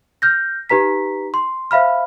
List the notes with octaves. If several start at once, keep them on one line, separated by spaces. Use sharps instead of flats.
F6 G6 A#6
D#4 G4 B4 A#5 B6
C6
C5 E5 F5 B5 F6